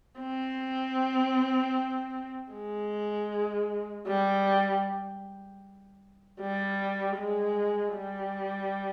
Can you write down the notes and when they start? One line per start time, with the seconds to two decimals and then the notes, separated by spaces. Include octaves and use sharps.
0.20 C4
2.52 G#3
4.07 G3
6.40 G3
7.17 G#3
7.94 G3